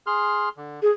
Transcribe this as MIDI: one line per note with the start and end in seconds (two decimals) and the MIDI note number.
0.07 0.49 68
0.07 0.49 84
0.07 0.49 89
0.57 0.80 50
0.82 0.90 68